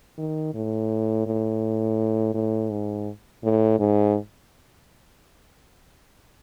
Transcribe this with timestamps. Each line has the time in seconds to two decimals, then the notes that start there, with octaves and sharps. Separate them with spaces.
0.18 D#3
0.54 A2
1.27 A2
2.34 A2
2.71 G#2
3.43 A2
3.79 G#2